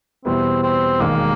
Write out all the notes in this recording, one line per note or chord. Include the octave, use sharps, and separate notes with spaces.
E2 B2 G3 B3 C4 E4
C4
E1 D#2 D#3 G#3 A#3